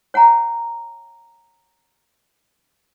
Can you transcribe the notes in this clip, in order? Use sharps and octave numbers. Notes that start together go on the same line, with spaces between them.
C#5 F#5 G#5 A#5